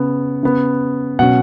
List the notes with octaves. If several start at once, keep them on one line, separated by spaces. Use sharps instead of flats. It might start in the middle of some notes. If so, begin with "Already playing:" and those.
Already playing: C#3 B3
C#3 B3
B2 F#3 C#4 F#5